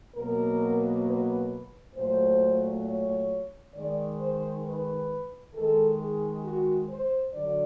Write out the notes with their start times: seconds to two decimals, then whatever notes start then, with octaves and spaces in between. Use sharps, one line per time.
0.15 B2 F#3 A#3 A#4
1.05 B4
1.95 A#2 F#3 A3 C5
2.85 C#5
3.75 D#3 G#3 D5
4.19 C5
4.65 B4
5.54 D#3 G#3 A4
6.00 G#4
6.44 F#4
6.89 C5
7.34 D3 F#3 D5